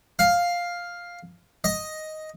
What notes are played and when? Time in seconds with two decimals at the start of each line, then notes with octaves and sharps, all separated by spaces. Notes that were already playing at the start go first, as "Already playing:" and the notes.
0.19 F5
1.64 D#5